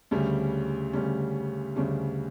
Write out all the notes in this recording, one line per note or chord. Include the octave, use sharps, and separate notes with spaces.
D2 C#3 G3 C#4
D2 C#3 G3 C#4
D2 C#3 G3 C#4